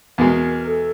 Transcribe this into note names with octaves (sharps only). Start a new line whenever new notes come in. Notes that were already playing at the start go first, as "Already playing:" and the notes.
E2 B2 G#3 A#4
A4